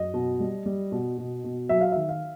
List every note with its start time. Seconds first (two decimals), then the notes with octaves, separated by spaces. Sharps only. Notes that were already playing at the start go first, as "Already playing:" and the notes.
Already playing: F#2 D#5
0.14 B2
0.40 G3
0.66 G3
0.92 B2
1.18 B2
1.44 B2
1.69 F#3 E5
1.81 F5
1.92 D#3 E5
2.09 F5